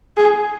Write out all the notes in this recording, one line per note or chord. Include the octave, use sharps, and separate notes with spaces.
G#4